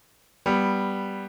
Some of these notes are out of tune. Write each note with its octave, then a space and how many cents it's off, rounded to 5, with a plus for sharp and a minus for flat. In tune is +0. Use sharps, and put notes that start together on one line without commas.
G3 +0 B3 +0